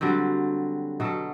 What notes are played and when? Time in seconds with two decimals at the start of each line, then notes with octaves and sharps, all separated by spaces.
0.01 D3 F#3 G3 C4
1.00 B2 F#3 A4